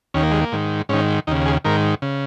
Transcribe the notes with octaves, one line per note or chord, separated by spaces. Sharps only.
D#2 D#3 C#4
A#3
G#3
A#3
G#2 D#3
G#2 D#3 C#4
D#2 C#3 D#4
G#4
G#2 D#3 A#4
C#3